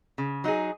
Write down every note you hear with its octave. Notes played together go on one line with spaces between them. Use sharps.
C#3
F#3 D#4 G#4